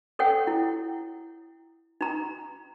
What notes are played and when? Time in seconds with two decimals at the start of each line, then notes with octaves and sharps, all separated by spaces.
0.19 A4 C#5 F#5 G5
0.47 E4
2.01 D#4 A#5